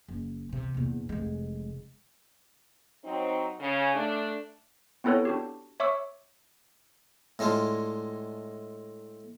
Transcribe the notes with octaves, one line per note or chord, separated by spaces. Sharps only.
F#1
E2 C3
A#1 E2
F1 G#3
F#3 C4 D#4
C#3
A3 D4
B3 C4 E4 A4 B4 C#5
D4 F#4 G4
C#5 E5 C#6 D6 E6
A2 G#3 D4 F4